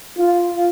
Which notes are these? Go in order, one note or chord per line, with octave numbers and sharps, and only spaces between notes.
F4